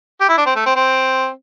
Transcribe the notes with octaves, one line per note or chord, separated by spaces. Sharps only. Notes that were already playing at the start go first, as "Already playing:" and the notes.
G4
E4
D4
C4
A3
C4
C4